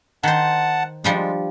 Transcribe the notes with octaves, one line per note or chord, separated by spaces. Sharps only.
D#3 C5 F#5 A5
F3 G3 G#3 D4